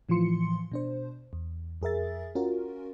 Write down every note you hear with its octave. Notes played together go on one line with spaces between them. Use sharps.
A2 E3 F3 F4 C6 C#7
B2 D4 C5
E2
F2 G#4 A#4 E5 A6
C#4 F4 F#4 A#4